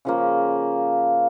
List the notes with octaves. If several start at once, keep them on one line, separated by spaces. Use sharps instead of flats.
C#3 F3 A#3